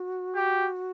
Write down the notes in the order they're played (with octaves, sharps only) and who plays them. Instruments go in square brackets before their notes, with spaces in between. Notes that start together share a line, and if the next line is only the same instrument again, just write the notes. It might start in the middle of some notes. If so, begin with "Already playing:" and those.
Already playing: [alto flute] F#4
[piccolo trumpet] G4